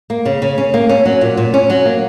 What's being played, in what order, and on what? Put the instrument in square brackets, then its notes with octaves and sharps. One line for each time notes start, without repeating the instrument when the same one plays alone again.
[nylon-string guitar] A#3
C#3
C#3
C#4
A#3
C#4
F#3
A#2
A#2
C#4
F#3
A#3